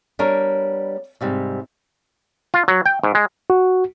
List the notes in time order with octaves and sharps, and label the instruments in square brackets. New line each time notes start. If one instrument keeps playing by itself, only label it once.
[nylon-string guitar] G3 B3 D4 A#4 C#5
G#2 C3 G3
[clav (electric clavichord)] F4
F#3
G5
G#2
G#3
[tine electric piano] F#4